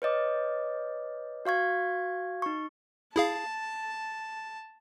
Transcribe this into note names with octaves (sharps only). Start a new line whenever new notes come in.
B4 C#5 D#5 D6
F#4 F5 C#6 G#6
D#4 C#6
E4 G#4 F5 A5